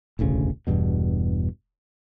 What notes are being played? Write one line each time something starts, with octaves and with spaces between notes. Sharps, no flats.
E1 A1 D2 C#3
E1 E2 G2 B2